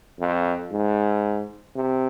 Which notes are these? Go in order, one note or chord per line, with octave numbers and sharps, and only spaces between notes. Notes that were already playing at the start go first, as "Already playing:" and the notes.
F2
G#2
C3